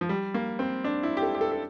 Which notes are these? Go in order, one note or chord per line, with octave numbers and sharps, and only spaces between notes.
F3
G3
A#3
C4
D4
E4
G4
A4
G4
A4
A4